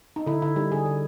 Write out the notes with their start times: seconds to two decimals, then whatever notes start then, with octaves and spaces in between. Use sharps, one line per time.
0.16 D#4
0.26 D3 E4
0.42 D3 E4
0.56 G3 D#4
0.72 D3 G#4
0.86 D3